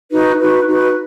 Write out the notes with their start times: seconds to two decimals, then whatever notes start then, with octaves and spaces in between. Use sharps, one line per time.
0.10 D#4 F#4 B4
0.38 D#4 F#4 B4
0.66 D#4 F#4 B4